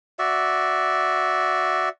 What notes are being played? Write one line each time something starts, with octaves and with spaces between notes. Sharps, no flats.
F#4 D5 E5